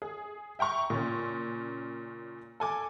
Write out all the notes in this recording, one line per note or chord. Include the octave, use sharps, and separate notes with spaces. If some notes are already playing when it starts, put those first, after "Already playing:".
G#4
E5 G5 A#5 C#6
A#2 C#3 C#4
A4 G#5 D6